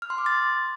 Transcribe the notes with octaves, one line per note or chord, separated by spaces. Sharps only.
F6
C6
D6
A6